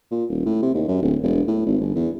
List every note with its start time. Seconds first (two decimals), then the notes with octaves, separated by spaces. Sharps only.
0.11 A#2
0.29 D#1
0.46 A2
0.62 C3
0.75 D#2
0.88 F#2
1.02 D1
1.23 E1
1.48 A2
1.66 G#1
1.81 G1
1.96 E2